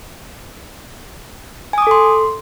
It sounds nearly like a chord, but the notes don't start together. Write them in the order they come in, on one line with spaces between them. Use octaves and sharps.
G#5 D#6 D6 A4 C6